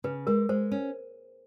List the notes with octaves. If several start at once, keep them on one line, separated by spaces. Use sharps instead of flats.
C#3 B4
G#3 A#4
G#3 C5
C#4